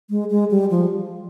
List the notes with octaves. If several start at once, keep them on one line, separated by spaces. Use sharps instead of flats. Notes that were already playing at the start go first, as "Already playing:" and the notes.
G#3
G#3
G3
F3